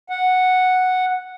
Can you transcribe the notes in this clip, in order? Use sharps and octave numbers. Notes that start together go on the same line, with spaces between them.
F#5